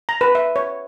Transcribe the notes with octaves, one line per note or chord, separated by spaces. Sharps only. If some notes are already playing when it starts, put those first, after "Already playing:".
A#5
B4
E5
C#5